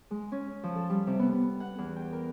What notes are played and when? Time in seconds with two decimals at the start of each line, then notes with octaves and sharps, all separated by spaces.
0.11 G#3
0.32 C#4
0.64 F3
0.75 A4
0.90 G3
1.07 C3
1.19 B3
1.32 B3
1.60 F#5
1.78 E2
1.96 G5
2.13 A#4